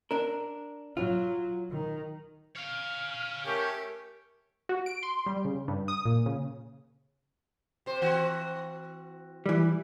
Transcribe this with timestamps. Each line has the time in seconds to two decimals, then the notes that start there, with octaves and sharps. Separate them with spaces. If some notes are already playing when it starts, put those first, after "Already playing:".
0.11 D4 A#4
0.97 F#3 F4
1.71 D#3
2.56 C#5 F5 F6
3.46 A3 C#4 G4 A#4
4.69 F#4
4.86 D7
5.03 C6
5.26 G3
5.45 C#3
5.68 G2
5.88 D#6
6.05 A#2
6.26 C#3
7.86 C3 C5
8.02 E3 C4 F#4
9.46 E3 G3